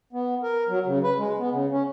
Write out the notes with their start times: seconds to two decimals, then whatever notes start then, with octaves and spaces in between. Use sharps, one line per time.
0.13 B3
0.43 A#4
0.68 F#3
0.85 C#3
1.04 B4
1.18 G#3
1.39 B3
1.52 C#3
1.71 C#4